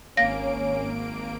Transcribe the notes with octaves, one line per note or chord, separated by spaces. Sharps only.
G#1 A#3 C#4 F5 A#6 D7